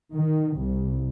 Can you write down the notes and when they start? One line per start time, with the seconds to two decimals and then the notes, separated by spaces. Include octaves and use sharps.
0.13 D#3
0.56 C2